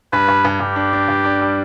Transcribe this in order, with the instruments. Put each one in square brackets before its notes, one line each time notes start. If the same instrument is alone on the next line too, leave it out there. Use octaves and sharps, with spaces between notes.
[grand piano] G2 [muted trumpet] B4
[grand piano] G2
G2
[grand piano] G2 [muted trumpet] G4
[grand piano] D4
D4
G2
D4
G3